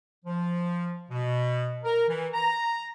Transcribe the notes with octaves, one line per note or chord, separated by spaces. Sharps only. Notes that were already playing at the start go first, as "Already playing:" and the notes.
F3
B2
A#4
E3
A#5